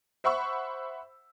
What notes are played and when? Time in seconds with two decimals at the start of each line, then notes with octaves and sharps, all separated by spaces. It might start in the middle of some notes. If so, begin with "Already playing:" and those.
0.24 C5 E5 F#5 B5 C#6 E6